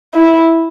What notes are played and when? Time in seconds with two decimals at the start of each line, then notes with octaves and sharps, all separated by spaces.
0.14 E4